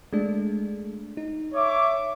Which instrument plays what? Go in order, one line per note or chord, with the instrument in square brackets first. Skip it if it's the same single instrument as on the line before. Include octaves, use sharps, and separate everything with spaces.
[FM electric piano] G#3 A3 D4
D#4
[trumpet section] C#5 E5 D6